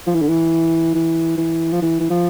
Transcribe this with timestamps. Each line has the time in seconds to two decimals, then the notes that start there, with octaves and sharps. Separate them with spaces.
0.07 F3
0.14 E3
0.22 D3
0.29 E3
0.94 E3
1.38 E3
1.72 F3
1.81 E3
2.00 E3
2.10 F3